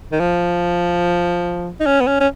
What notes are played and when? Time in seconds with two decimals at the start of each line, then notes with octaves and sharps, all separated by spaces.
0.12 D#3
0.19 F3
1.80 D#4
1.86 C#4
2.01 B3
2.07 C#4
2.20 C#4